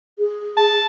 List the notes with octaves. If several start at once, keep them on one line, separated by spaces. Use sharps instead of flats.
G#4
A5